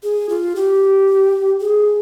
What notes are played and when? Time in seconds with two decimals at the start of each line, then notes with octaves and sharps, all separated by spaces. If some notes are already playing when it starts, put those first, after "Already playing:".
0.03 G#4
0.29 F4
0.56 G4
1.61 G#4